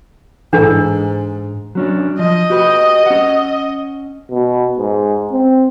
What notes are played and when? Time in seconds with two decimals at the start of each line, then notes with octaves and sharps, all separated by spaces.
0.53 G#2 E3 D4 A4 B4
1.75 F#3 C#4 D4
2.19 F3 D#5
2.50 F#4 G4 B4
3.06 C#4 F#5
4.31 B2
4.78 G#2
5.32 C4